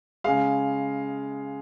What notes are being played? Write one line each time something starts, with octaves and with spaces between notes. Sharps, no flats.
C#3 G#3 F5